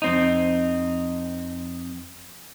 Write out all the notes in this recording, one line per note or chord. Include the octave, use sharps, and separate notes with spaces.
F2 C4 D#4